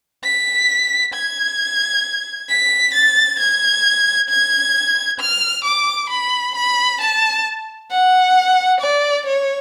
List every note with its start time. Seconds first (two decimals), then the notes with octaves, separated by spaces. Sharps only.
0.24 B6
1.14 G#6
2.49 B6
2.95 A6
3.40 G#6
4.29 G#6
5.20 F6
5.65 D6
6.10 B5
6.56 B5
7.01 A5
7.91 F#5
8.81 D5
9.27 C#5